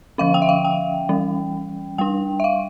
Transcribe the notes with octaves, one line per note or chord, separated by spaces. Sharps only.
D3 F3 C#4 F5
G5
E5
F5
G5
E3 G3 C#4
G3 D4 G5
E5
F5